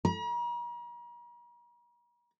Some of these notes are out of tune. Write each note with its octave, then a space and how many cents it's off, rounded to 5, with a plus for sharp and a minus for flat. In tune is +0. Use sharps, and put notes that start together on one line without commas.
A#5 +45